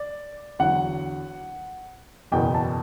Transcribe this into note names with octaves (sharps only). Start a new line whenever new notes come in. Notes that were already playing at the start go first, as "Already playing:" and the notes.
Already playing: D5
E2 D3 F#3 F#5
F#1 E2 B2 G5
A5